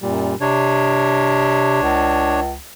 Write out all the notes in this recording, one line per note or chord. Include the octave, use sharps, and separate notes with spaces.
F#2 A#2 G3
C3 D4 C#5
C#2